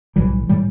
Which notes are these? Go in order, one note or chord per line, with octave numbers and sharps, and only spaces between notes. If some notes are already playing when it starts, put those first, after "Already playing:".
B1 A2 E3 G3
A2 E3 G3